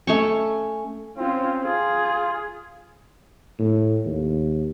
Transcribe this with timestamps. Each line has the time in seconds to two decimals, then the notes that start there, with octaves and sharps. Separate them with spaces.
0.07 A3 C#4 C#6
1.17 C4 C#4 F4
1.64 F4 G#4
3.59 A2
4.06 D#2